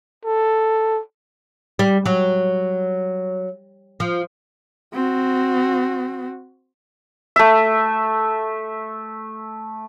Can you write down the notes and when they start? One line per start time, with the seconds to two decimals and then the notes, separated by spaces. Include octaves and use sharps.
0.25 A4
1.79 G3
2.06 F#3
4.00 F3
4.94 C4 F#4
7.36 A3 E5